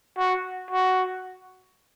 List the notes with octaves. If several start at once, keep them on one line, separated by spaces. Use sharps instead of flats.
F#4
F#4